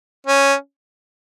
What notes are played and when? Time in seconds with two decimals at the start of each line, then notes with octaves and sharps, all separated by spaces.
0.27 C#4